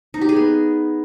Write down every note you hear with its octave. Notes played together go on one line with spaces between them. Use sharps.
D#4
G4
G#4
B3